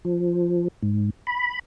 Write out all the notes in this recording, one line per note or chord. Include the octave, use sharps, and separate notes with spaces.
F3
G#2
B5